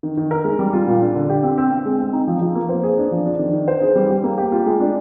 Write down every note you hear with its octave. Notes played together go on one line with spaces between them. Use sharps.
D#3
D#3
A#4
G#3
G3
F4
A#2
D4
D3
G4
C4
C4
C4
G#3
C4
D#4
F3
F3
A#3
C5
G#4
D4
F3
D4
D#3
D#3
C5
G#4
G3
G4
A#3
G4
F4
G#3
D4